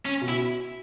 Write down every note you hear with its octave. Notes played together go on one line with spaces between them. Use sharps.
C#4
B2
E4